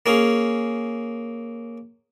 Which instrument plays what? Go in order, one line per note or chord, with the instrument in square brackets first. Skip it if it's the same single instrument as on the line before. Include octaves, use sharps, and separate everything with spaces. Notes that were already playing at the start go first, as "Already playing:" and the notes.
[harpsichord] A#3 C#4 G#4